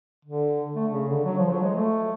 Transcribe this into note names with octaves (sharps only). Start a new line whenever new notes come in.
D3
A3
C#3
D3
F#3
F3
F#3
G#3
A3